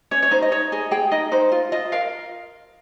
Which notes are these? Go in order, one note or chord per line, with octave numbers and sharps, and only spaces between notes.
C#4 C#5
C#5
D#4 C5
D#5
D#4 C#5
G#4 D#5
G#4 G5
D#4 D#5
D#4 C5
F4
F4 D#5
A#4 F5